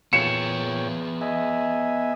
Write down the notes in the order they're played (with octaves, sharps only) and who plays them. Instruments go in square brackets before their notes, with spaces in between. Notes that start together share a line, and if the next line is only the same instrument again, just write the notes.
[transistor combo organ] A#2 C#5 G5 [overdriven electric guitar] B3 G#4 [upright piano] C#7 E7
[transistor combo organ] D#5 E5 G#5